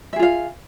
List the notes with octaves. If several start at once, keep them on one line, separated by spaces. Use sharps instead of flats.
F4 G#4 E5 F5